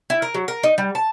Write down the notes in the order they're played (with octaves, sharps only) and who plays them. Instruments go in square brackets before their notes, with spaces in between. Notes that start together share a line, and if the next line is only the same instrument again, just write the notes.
[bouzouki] E4
A#4
F#3
A#4
D#4
G3
A5